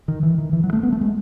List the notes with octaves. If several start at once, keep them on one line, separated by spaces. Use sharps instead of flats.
D#3
E3
D#3
E3
F#3
A3
B3
A3
G#3